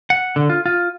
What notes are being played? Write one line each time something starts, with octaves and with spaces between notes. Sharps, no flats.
F#5
D3
F4
F4